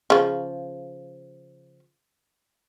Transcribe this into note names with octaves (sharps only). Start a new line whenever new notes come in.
C#3 F3